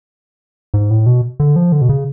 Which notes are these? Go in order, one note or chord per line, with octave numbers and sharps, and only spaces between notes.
G#2
A2
B2
D3
F3
D3
B2
C#3